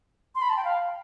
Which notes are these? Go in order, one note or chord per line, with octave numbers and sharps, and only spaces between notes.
C6
B5
A5
G5
F5